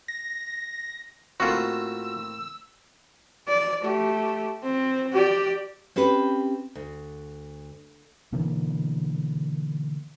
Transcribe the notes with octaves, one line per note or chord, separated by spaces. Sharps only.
A#6
A2 A#3 C4 F4 F#4 E6
D5
A3 G4
C4
G4 D5
C4 C#4 G4 B4
D2
B2 D3 E3 A#3